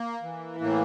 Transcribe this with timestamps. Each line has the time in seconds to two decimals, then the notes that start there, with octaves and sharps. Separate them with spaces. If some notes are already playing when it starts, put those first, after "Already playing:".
Already playing: A#3
0.23 E3
0.61 A2 A#3